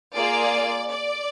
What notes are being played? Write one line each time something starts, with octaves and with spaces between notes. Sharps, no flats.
A#3 F4 G#4 D5
D5